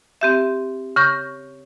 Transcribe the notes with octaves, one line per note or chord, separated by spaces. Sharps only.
C4 G4 E5
C#3 C#6 G6 A#6